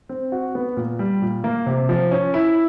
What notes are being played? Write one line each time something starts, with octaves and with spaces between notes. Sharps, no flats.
C4
F#4
B3
A#2
G3
A#2
A#3
C3
F3
C#4
E4